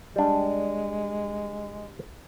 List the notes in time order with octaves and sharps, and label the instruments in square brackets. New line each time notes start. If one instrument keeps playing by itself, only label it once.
[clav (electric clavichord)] G3 D4 [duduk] G#3